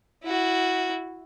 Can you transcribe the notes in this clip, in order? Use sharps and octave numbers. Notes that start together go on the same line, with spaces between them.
E4 F#4